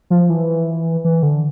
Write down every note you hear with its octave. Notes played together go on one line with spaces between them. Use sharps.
F3
E3
E3
D3